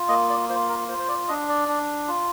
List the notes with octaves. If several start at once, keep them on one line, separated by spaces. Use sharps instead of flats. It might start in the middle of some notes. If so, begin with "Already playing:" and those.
Already playing: F4
A#3 D#5
D5
F4 C5
A#4
F4 C5
C5
D5
D4 D#5
D5
D4
F4